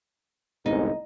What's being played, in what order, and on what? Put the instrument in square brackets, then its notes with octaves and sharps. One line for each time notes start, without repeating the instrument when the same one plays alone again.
[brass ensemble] G1 C2 G#2 [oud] D#4